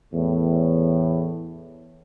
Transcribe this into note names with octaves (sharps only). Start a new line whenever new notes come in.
E2 A2